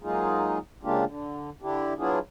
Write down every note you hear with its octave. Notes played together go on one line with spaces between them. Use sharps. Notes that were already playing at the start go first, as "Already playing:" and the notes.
F#3 G#3 A#3 D#4 F4 G#4
C#3 G#3 A#3 D4 F4 G4
D3
D3 D4 E4 G4
F#3 B3 D4 E4 F4 G#4